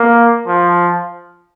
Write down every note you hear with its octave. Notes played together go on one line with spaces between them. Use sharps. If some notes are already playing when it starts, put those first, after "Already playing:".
Already playing: A#3
F3